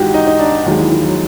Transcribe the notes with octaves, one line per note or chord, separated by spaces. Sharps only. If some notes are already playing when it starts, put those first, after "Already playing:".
Already playing: G#1 G#2 E3 F#4 G4
D#4
D#4
D4
D#2 D#3 F#3 G#3
E3
F3
F#3